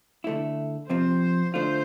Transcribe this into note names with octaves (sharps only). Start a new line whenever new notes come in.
D3 A3 E4
F2 C3 F3 C4 C5
D3 A3 D4 F4 C5